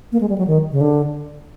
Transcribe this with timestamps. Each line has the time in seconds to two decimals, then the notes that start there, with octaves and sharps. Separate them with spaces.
0.12 A#3
0.21 G#3
0.29 G3
0.38 F#3
0.47 D#3
0.71 C#3
0.81 D3